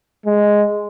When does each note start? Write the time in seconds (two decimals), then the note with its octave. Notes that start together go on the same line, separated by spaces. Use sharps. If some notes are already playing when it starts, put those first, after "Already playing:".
0.26 G#3